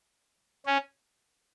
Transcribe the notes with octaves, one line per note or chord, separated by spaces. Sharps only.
C#4